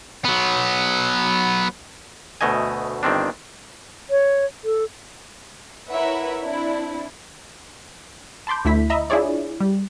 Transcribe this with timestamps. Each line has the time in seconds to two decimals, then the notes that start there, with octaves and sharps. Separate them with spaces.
0.25 F#3 B3
2.41 D2 B2 A3 D#5 G#5
3.03 G1 D#3 C4 D4
4.10 C#5
4.64 A4
5.89 E4 A#4 B4 C#5 E5 F#5
6.44 C4 D4 E4
8.47 A5 B5 C6 D6 G6
8.65 D2 A3 E4 B6
8.90 D#5 E5 A#5 B5
9.10 D4 E4 F4 G#4 C#5 D5
9.60 G3